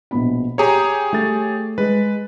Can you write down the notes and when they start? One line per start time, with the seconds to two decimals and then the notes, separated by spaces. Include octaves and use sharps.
0.11 A#1 B2 B5
0.58 G4 G#4 C#5 A#5
1.13 A3 A6
1.78 G#3 B4